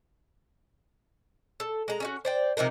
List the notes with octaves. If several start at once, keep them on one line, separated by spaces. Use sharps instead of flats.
A4
G#3 A#5
C#4 D#4 F#4
C5 D5 G5
C3 F3 D#4 A#4